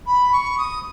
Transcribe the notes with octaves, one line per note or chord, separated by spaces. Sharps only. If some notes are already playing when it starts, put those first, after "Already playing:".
B5
C#6
D#6